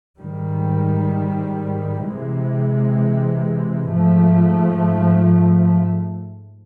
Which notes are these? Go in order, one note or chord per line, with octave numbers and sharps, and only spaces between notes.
G#2 D#3 G3
C3 E3 G#3
G#2 F3 A3